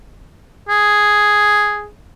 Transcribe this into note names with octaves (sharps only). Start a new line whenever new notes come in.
G#4